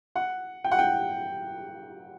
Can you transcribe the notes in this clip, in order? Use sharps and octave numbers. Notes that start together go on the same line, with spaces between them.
F#5
G5
F#5
G5